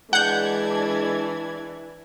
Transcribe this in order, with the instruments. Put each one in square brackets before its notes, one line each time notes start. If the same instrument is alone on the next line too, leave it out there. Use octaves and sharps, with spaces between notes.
[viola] E3 [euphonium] G#3 [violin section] D4 D5 G#6 [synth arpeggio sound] F#5 G6